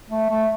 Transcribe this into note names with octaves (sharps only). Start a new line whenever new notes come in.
A3
A3